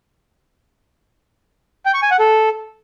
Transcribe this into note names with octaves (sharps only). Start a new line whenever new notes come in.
G5
C#6
G#5
F#5
A4